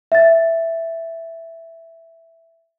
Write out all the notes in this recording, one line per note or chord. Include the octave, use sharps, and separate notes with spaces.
E5 A6